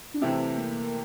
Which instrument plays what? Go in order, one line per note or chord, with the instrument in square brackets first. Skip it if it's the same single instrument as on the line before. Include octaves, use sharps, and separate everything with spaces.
[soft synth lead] D4
[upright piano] C3 E3 A3 E4 G4 [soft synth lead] C4
[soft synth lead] A#3